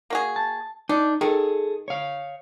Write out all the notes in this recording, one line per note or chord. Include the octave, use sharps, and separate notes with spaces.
A#3 F#4 G#4
A5
D4 D#4
D#3 G#4 A4
C#5 F5